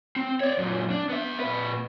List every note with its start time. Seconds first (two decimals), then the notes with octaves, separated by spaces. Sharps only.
0.16 C4
0.41 C#5 D5
0.58 F#2 A#2
0.90 D4
1.09 B3 E5
1.40 A#2 B4